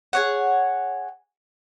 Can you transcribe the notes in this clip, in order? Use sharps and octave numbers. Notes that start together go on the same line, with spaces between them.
G#4 C#5 F#5